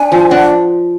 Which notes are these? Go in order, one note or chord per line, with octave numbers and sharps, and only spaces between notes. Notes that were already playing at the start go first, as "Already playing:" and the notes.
Already playing: D4 G#5
F3
D4 F#5